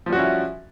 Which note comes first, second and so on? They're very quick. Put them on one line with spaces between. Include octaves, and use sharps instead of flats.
F3 G3 F#4 C#4 E4